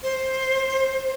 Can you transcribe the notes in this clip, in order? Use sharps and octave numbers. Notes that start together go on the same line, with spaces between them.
C5